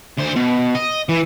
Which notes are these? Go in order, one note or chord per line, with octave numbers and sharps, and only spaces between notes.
D2 C5
B2
D#5
E3